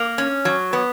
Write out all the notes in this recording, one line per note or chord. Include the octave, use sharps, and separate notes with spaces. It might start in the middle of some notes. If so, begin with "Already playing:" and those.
Already playing: A#3
C#4
F#3
B3